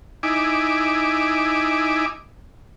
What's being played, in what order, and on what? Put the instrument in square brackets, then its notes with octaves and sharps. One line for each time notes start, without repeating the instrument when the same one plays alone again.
[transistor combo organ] D#4 E4 G#5 D6